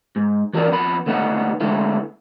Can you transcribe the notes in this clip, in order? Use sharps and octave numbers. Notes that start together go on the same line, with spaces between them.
G#2
E3 F#4 A4 A#4 D5
F2 B3 B5
D2 A3 B3 D4 D#4 F#5
D3 G#3 A3 B3 E4